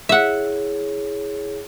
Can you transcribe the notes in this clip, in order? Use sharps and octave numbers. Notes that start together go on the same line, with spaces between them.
E4 G#4 C#5 E5 F#5